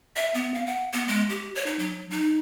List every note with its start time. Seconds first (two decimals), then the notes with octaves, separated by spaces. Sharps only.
0.16 E5
0.34 B3
0.54 F5
0.66 F#5
0.93 B3
1.08 G#3
1.29 G4
1.55 C#5
1.66 D#4
1.79 F#3
2.11 D#4